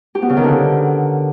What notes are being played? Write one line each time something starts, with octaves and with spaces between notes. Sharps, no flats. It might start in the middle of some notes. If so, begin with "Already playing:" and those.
G4
B3
C#3
D#3
D3